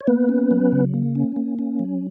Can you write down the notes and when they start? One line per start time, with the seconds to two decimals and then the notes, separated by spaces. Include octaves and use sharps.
0.01 C#5
0.07 A#3 B3 B4
0.29 C#4
0.51 F#3
0.72 C#3
0.94 A#3
1.15 C#4
1.36 A#3
1.59 C#4
1.79 F#3